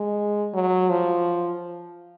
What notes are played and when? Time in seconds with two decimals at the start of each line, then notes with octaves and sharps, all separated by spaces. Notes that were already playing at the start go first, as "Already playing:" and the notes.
Already playing: G#3
0.54 F#3
0.90 F3